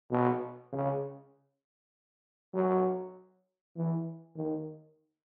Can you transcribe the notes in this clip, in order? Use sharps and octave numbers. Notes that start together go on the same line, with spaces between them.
B2
C#3
F#3
E3
D#3